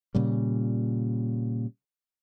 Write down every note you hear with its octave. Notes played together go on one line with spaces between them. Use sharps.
A#2 C#3 G3